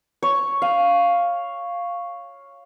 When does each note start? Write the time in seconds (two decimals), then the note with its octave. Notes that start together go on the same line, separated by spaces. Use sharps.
0.22 C#5
0.62 F5